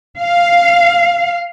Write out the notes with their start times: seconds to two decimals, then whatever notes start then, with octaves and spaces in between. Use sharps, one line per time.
0.19 F5